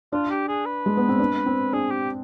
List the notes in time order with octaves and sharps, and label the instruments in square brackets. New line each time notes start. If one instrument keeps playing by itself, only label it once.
[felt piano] D4 [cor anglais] F4
[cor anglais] G4
G#4
B4
[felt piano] G#3
B3
C4
D4
C4
[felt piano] D4 [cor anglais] G#4
[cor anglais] G4